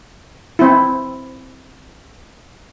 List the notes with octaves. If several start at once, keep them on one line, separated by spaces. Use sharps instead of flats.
C4 E4